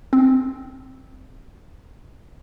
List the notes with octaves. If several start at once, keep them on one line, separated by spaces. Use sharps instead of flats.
C4